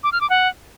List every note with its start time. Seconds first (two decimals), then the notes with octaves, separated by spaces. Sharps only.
0.04 D6
0.12 F6
0.21 D6
0.30 F#5